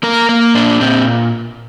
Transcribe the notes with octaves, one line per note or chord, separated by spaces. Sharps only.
A#3 A#4
A#3
A#2 D4
A#2 C4